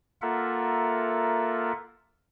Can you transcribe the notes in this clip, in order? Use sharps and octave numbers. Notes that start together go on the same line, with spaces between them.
A#3 F4 A4 A#4 E5 F#5